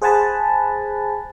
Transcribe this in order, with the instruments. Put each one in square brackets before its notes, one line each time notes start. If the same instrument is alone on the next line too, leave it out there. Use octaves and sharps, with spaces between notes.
[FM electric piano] G#4 C5 F#5 G#5 A5 B5